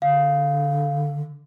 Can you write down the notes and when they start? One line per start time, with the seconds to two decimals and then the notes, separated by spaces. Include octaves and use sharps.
0.02 D3 F5